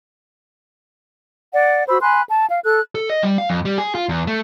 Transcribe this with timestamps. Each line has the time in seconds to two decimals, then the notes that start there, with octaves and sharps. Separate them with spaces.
1.53 D5 F#5
1.89 F#4 C5 B5 E6
2.01 G#5 B5 C6 F#6
2.28 A5
2.49 F5
2.64 A4 F#6
2.95 A4
3.10 D#5
3.23 G3
3.38 F5
3.50 F2
3.65 G3
3.78 G#4
3.95 F4
4.09 E2
4.27 A3